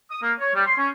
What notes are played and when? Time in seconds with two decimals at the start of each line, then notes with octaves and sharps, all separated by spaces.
0.10 D#6
0.23 A#3
0.39 C#5
0.54 G3
0.66 C6
0.78 C#4